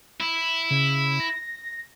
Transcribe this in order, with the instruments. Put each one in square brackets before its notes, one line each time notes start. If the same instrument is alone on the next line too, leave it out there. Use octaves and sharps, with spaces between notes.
[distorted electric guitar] E4
[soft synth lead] C#3
A#6